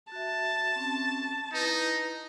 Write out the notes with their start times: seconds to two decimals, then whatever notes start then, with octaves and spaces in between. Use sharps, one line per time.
0.12 F#4 E5 A5
0.76 C4 C#4
1.54 D#4 E4 B4